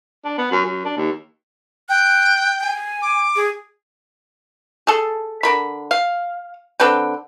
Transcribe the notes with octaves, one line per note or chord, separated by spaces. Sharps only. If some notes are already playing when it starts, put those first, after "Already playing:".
D4
B3
F#2
F#2
D4
D#2
G5 F#6
G#5
D6
G#4
G#4 A4
D3 A#4 B5
F5
D3 C4 B4 G5